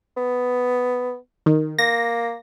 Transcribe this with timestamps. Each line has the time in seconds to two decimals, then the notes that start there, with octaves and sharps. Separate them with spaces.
0.17 B3
1.46 D#3
1.79 A#3 A#6